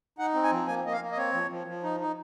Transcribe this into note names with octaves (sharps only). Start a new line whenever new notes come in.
D#4 F#5
C4
G#5
F3
A#3 G#5
A#3 D#5
F5
A#3
D#5
C4 C#5
F3
F3
F3
D#4
D#4